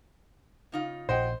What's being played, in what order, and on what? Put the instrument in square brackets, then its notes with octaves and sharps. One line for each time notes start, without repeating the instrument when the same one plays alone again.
[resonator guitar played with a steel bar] C#3 D#4 F4
[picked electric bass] A#1 [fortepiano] C5 [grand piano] D#5 F#5 G5